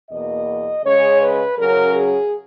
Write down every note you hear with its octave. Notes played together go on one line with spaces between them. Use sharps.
E2 B2 A#3 D#5
C#3 G#3 C#4 C#5
B4
C#3 F#3 C#4 A#4
G#4